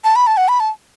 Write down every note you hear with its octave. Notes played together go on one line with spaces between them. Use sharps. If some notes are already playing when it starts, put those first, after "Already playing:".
A5
B5
A5
F#5
B5
A5